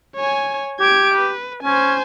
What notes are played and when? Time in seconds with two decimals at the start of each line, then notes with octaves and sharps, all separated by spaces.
0.16 C#5 G#5
0.80 G4 G#6 D7
1.14 B4
1.63 C#4 C5 G#5